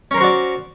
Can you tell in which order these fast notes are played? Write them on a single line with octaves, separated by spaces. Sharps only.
C#4 A#4 C5 F#4 D5